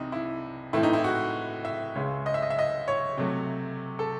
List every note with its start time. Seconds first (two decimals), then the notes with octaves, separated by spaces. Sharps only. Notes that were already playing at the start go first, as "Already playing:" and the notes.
Already playing: C2 C3 E3 C4 D#4 E4
0.12 E4
0.73 A2 E3 A3 C4 E4
0.83 D#4
0.93 E4
1.04 F#4
1.65 E5
1.95 C#2 C#3 G#3 C#4
2.26 D#5
2.34 E5
2.42 D#5
2.50 E5
2.59 D#5
2.88 C#5
3.18 C3 F#3 A3
3.99 A4